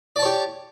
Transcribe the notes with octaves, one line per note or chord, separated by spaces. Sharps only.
G4 C#5 D5 A5